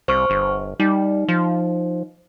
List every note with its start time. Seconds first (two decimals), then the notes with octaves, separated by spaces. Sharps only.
0.08 C2 C5 C#6 F6
0.30 G1
0.80 G3 D#4
1.28 F3